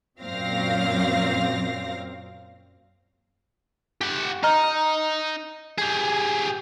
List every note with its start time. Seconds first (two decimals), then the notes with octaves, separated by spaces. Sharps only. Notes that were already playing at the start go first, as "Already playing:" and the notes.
0.20 F#2 A#2 F#3 C4 F5 A#6
4.01 G4 F#5
4.43 D#4 D#5 A#5 F6
5.79 G4 G#4